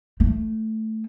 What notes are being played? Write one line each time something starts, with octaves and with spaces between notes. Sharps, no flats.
A3